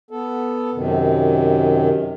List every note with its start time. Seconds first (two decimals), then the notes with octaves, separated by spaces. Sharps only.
0.11 B3 A4
0.74 F#2 C3 D#3